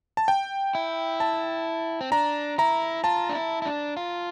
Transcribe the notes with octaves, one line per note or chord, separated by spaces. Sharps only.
A5
G5
E4
A5
C4
D4 A#5
E4 A#5
F4 A5
D4
E4
E4
D4
F4